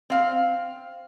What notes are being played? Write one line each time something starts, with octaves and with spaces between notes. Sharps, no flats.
C4 F5